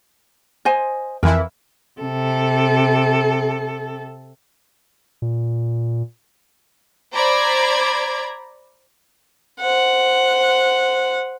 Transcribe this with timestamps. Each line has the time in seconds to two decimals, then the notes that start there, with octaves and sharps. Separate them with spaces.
0.65 C5 D#5 G#5
1.23 F2 E3 E4 A#4
2.01 C3 A4
5.22 A#2
7.14 C5 D5 A#5 B5 G#6
9.60 C5 F#5